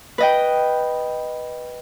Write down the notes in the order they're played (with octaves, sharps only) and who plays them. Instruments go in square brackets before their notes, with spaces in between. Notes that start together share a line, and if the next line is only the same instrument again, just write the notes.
[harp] B4 D#5 G5